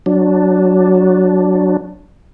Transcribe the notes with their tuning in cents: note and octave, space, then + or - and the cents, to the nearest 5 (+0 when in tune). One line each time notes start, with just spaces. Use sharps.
F#3 +0 D4 +0